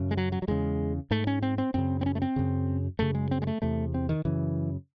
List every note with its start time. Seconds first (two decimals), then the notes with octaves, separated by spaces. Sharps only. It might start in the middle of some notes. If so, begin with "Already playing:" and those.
Already playing: F#2 C#3
0.11 G#3
0.17 F#3
0.32 F#3
0.42 F#3
0.48 E2 C#3 G#3
1.11 G#2 A3
1.27 C#4
1.42 C4
1.58 C4
1.74 F#2 C#3 C4
2.01 C4
2.06 C#4
2.15 A3
2.22 C4
2.36 F#2 C#3
2.99 F#2 C#3 A3
3.15 G#3
3.31 C4
3.42 G#3
3.47 A3
3.62 E2 C3 A3
3.94 C4
4.09 D#3
4.25 F#2 C#3 E3